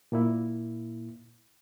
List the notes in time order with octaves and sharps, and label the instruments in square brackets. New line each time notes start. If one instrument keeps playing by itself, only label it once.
[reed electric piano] A#2 A#3 E4